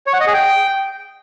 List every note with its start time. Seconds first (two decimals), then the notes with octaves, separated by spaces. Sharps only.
0.06 C#5
0.13 F#5
0.20 D#5
0.27 G#4
0.34 G5